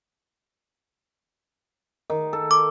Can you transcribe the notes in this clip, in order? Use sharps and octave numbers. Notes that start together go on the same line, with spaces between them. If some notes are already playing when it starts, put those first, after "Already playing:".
D#3
A4
D6